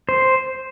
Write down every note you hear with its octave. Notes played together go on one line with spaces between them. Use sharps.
C5